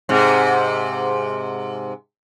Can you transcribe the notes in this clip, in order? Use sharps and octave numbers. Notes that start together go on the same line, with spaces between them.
G#2 C3